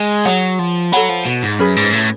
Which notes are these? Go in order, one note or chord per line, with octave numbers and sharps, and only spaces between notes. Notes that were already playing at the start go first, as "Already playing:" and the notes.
Already playing: G#3
F#3 G#4 C#5 F#5
F3
F#3 A4 C#5 F#5 B5
F3
B2
G#2
F#2 C#4 G#4 B4
G#2
A2